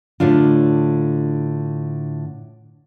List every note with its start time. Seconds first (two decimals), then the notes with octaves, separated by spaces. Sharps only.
0.20 A2 D3 D4 F4